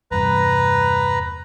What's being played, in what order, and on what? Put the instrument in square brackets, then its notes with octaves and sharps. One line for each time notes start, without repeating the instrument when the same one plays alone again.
[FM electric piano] E2 G2 C3 [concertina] B4 A#5